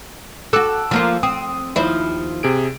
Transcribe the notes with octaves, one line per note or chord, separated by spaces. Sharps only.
F#4 A4 D6 E6 F#6
F3 A#3 F4
C4 D#6
D#2 F3 E4
C3 G#4 D7